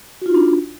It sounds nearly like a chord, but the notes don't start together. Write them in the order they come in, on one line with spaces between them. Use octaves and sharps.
F#4 F4 D#4 D4